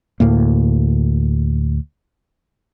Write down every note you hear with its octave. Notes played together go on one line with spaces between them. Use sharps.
D2 A2 A#3